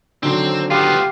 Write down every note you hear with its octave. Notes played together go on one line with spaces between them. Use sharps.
D3 D#3 F#3 C4
B3 F4 G4 F5